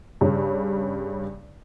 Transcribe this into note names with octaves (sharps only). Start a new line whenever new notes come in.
G2 C#3